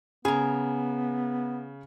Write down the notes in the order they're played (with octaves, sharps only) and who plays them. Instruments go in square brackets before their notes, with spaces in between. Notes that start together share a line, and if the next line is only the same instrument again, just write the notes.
[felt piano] C#3 [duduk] B3 [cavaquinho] G#4 A#4